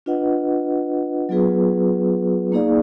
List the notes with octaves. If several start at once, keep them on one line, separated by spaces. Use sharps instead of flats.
D4 F4 B4 D#5 F#5
F#3 B3 F4 G#4 B4
A#3 D#4 G#4 D5 F5